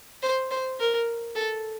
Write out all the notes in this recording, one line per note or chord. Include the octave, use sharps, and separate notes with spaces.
C5
C5
A#4
A4